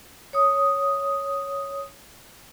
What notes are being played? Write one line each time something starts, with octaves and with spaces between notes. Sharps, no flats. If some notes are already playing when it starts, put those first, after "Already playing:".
C#5 D#6